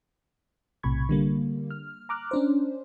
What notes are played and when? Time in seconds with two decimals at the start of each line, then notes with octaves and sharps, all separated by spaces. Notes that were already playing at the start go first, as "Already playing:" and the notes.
0.83 B1 A2 C3 B5 C#6 G#6
1.09 D3 G3 A#3
1.71 F6
2.09 A#5 D6 F6 F#6
2.31 C#4 D4 C5